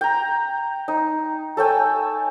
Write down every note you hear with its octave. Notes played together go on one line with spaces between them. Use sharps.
G5 A#5
D#4
A4 C#5 G5 G#5